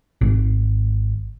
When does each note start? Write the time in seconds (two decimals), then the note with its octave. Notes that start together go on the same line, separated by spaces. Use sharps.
0.21 G#1